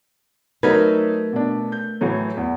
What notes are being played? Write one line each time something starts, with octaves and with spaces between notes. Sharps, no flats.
F#3 A3 D#4 A#4 B4 G#6
B2 D4
G6
A2 E3 F#3
E2